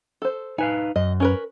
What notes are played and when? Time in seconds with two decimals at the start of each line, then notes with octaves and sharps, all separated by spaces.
0.22 A4 C5
0.58 D#4 B4 F5 G#5
0.96 F#2 D#5
1.20 C#4 A#4 B4